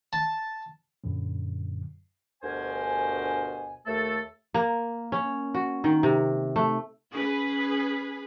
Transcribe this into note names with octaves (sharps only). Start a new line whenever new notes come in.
A5
F#2 A#2 D3 F#3
D2 G2 B2 A#4 C5 G#5
D#2 A3 A4
A#3
C#4
F#4
D#3
C3
A3
C#4 G#4 B4